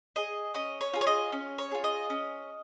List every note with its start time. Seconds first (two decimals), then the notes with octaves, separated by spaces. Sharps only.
0.16 G#4 D#5
0.54 C#4 D#5
0.81 C#5
0.94 F4 G#4
1.01 C#5
1.07 D#5
1.32 C#4
1.58 C#5
1.72 F4 G#4
1.84 D#5
2.10 C#4